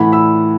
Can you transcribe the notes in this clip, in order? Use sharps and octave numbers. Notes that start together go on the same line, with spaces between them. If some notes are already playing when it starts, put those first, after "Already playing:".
Already playing: A2 E3 F#5 B5
B5 E6